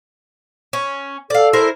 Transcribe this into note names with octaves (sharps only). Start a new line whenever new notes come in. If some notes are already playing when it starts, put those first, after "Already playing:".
C#4
A4 D5 F5
E4 A#4 C5